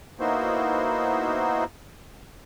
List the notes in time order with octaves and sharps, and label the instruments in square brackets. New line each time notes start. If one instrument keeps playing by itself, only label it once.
[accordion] A#3 B3 D#4 E4 F#4 C5